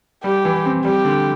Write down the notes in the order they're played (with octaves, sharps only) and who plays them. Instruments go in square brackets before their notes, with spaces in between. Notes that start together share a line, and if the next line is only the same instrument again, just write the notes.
[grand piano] G3 [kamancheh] G4
[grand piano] E3
C4
[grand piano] G3 [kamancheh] G4
[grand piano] D3